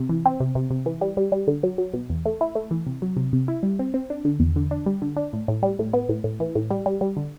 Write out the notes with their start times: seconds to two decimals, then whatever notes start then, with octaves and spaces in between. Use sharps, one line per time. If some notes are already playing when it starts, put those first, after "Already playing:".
Already playing: C3
0.09 E3
0.25 C4
0.40 C3
0.55 C3
0.71 C3
0.86 E3
1.01 G3
1.17 G3
1.32 G3
1.48 D3
1.63 F#3
1.78 F#3
1.94 B2
2.10 E2
2.26 A3
2.41 E4
2.55 A3
2.71 E3
2.87 C3
3.02 F#3
3.17 C3
3.33 C3
3.48 E4
3.63 G3
3.79 C4
3.94 C4
4.10 D4
4.25 D3
4.40 E2
4.56 D3
4.71 D4
4.86 G3
5.02 D3
5.17 D4
5.33 A2
5.48 A2
5.63 G3
5.79 A2
5.93 B3
6.09 A2
6.24 A2
6.40 E3
6.55 A2
6.71 G3
6.86 G3
7.01 G3
7.17 D3